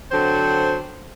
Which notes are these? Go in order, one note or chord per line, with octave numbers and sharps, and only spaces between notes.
D3 F#3 C4 A4 C5